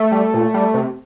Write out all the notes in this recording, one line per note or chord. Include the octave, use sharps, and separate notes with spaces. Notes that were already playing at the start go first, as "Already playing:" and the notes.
Already playing: A3
G3
A#2
G3
C3